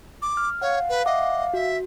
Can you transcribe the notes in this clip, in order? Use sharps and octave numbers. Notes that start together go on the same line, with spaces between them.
D6
F6
C#5 F5 F#5
B4
D#5 E5 F#5 D6
F#4 E5